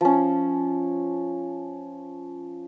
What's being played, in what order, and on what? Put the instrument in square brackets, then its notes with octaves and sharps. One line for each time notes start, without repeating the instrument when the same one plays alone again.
[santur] F3 C#4